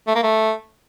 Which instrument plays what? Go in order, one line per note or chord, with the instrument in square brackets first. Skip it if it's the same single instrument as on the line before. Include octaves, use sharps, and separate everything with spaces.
[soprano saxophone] A3
A#3
A3